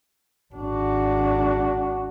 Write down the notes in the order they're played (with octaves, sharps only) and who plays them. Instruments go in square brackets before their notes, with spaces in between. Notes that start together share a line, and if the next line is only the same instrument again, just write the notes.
[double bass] G#1 D4 [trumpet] F#4